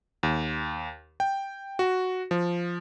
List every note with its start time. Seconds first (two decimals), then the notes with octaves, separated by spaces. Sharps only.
0.23 D#2
1.20 G5
1.79 F#4
2.31 F3